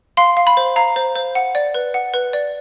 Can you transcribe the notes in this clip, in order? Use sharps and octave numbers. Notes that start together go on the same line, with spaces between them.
F5 C6
F5
B5
C5
F5 A#5
C5
C5
F#5
D5
B4
F#5
B4
D5